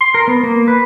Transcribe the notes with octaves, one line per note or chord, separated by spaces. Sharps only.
C6
A#4
B3
A#3
B4